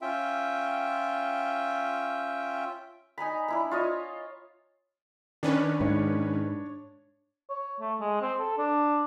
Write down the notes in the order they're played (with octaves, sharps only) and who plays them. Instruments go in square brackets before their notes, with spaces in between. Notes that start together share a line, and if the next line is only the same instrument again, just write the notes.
[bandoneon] C#4 F4 E5 G5
[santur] D#4 G#5 A#5 B5
D4 E4 B5
F4 C#5 D#5
[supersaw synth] D#3 C#4 B4 [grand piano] D4
[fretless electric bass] G#2 [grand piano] D4 C#5
[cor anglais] C#5
A3
G#3
C4
A4
D4